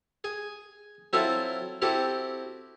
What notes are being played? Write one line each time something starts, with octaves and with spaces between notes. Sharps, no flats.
G#4 G#5
F#3 C4 E4 F4 A4 E5
C4 E4 F#4 G4 A4